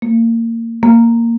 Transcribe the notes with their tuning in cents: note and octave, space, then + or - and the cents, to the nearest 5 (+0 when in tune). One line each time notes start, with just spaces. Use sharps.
A#3 -25
A#3 -10